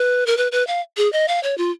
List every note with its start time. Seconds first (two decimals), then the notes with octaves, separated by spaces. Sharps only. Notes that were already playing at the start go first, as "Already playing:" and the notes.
Already playing: B4
0.26 A#4
0.37 B4
0.52 B4
0.67 F5
0.97 G#4
1.13 D#5
1.28 F5
1.43 C#5
1.58 F4